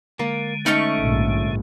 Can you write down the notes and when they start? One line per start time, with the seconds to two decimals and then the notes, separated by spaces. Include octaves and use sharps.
0.19 D3 G#3 A#3
0.66 A3 C#4 D#4 C#6
1.00 A#1 G#2